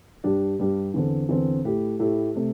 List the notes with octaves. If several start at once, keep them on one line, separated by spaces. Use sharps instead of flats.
G2 G3 D4 G4
G2 G3 D4 G4
E2 D3 C4
E2 D3 C4
A2 A3 E4 G4
A2 A3 E4 G4
C3 A3